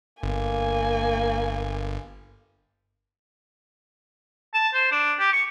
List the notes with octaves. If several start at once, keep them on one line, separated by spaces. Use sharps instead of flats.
G1 A#3 G#5
A5
C5
D4
G4
C#6